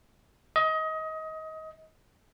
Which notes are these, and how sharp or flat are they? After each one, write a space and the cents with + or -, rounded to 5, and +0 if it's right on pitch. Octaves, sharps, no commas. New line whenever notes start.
D#5 +25